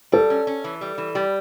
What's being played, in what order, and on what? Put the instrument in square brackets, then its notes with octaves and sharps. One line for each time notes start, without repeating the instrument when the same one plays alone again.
[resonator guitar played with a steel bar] G3 [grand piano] A4
[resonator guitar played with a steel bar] C#4
C#4
E3
G3
E3
G3